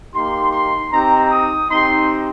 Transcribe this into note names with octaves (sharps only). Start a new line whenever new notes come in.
A#3 D#4 G4 C6
C6
C4 D#4 G4 A#5
D#6
C4 D#4 G4 C6